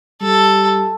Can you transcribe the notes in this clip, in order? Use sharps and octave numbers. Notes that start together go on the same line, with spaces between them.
G3 A4